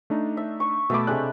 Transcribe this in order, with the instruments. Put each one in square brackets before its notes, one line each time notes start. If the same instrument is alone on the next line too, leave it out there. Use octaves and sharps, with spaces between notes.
[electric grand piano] A3 D4 D#4
[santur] E5
C#6
[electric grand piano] B2 A3 D6 [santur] E5 A5 B5
[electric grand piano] C3 G4 F#6 [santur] G#3 A3 D4